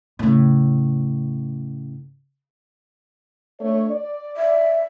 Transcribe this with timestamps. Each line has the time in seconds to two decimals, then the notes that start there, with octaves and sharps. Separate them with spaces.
0.19 A2 C#3
3.59 A3 D4 C#5
3.91 D5
4.37 E5